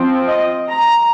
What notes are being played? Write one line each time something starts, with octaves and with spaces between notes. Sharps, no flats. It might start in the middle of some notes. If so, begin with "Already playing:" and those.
Already playing: F3 C4
D#5
A#5